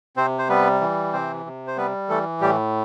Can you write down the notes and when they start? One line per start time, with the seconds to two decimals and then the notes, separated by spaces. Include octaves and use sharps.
0.16 C3 C4 C5
0.39 C5
0.49 G3 B3 B4
0.81 E3
1.13 C3 C4 C5
1.46 C3
1.68 C5
1.77 G3 B3 B4
2.09 E3 A3 A4
2.41 A2 G3 G4